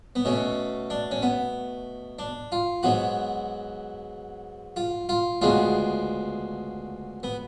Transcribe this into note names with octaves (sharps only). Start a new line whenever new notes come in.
B3
B2 A3 C#4
D4
C#4
B3
D4
F4
G#2 F#3 B3 F#4
F4
F4
D2 C#3 G#3 B3 F4
B3